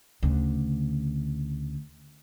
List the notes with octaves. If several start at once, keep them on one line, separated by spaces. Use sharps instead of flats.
D2 C#3